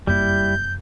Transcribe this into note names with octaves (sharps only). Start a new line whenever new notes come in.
F1 F#2 G3 A#3 E4 G6